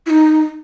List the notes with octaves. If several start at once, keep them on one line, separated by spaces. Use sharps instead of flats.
E4
D#4